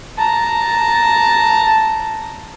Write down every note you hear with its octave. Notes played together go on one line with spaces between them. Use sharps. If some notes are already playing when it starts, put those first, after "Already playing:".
A5 A#5